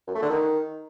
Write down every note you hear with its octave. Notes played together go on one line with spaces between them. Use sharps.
F#2
A3
D3
D#3